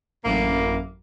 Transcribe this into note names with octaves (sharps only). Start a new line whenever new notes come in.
A1 F#2 A2 D3 A#3